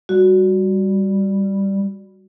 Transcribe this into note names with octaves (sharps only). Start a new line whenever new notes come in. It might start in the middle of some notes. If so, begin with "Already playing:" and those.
G3 F#4